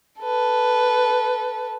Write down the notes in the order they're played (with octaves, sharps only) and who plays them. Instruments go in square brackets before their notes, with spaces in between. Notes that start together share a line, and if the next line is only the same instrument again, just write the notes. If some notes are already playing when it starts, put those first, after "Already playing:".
[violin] A4 B4